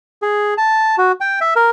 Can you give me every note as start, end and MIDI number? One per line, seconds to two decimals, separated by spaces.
0.22 0.54 68
0.58 0.95 81
0.98 1.12 66
1.20 1.39 79
1.41 1.54 76
1.56 1.70 70